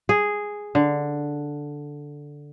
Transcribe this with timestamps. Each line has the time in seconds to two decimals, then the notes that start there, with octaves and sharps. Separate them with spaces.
0.09 G#4
0.75 D3